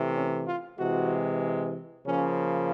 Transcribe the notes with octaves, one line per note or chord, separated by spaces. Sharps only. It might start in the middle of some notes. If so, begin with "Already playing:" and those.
Already playing: C3 E3 A3
C#4
F4
C3 E3 G#3 F#4
C#3 F3 A#3 C#4